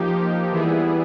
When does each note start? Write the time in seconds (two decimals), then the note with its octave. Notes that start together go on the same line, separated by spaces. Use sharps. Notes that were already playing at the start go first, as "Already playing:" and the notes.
Already playing: F3 A#3 D#4 G4
0.52 E3 G3 B3 E4 G#4